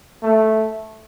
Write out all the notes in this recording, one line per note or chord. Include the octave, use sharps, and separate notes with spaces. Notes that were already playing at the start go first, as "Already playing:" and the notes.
A3